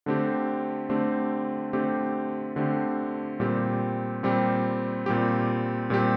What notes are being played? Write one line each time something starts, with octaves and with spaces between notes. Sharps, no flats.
D3 A3 C4 G4
D3 A3 C4 G4
D3 A3 C4 G4
D3 A3 C4 G4
A#2 G3 C4 G4
A#2 G3 C4 G4
A#2 G3 C4 G4
A#2 G3 C4 G4